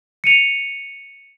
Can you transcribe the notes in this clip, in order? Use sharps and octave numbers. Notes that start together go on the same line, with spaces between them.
C#7 D#7 F7